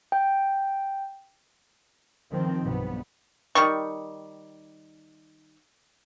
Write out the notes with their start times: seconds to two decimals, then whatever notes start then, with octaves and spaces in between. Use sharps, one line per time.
0.12 G5
2.29 D#3 F3 C4
2.63 B1 G2 B2 B3
3.55 D#3 G3 C#6